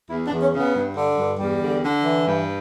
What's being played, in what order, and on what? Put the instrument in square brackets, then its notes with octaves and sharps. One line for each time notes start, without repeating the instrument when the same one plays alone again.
[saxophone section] E2 E4
D4
E2
C#4
C#3
B3
G2
D3
G2
E2 G3
D3
D3
E3
G2